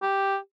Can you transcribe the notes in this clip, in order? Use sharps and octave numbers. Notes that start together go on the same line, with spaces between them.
G4